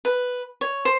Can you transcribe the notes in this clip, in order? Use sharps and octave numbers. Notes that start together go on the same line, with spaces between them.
B4
C#5
C5